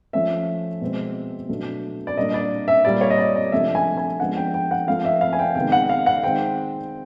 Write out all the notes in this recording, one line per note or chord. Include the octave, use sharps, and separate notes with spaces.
F3 A3 C#4 E5
B2 G#3 C4
B2 F#3 A3 D4
D5
A#2 G3 A#3 D4 D#5
D5
E5
A#2 G3 A#3 D5
C#5
D#5
D5
D#5
C3 F3 A3 D4 E5
G#5
G#5
F3 G#3 B3 D4 F#5
G5
G5
F#5
F3 A3 C4 F5
E5
F5
G#5
G5
C3 D#3 G#3 B3 G5
F#5
F5
F#5
D#3 G#3 C4 G5